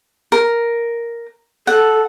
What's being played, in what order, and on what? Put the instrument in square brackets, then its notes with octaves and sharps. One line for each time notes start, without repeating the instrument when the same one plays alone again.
[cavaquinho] A#4
[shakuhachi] A4 [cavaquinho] F#5